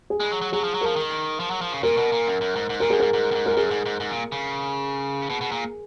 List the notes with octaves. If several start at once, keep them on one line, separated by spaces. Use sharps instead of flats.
G#4
G#3
F#3
F#3
F#3 G#4
F3
F#3
F3 A#4
D#3
F3
F#3
F3
C#3
A#2 A#4
B2
A#2
F#2
F#2
G#2
G#2
A#2 A#4
F#2 G#4
G#2 A#4
G#2
F#2
G#2
A#4
F#2 G#4
G#2
G#2
G#2
A#2
C#3
B2
B2
A#2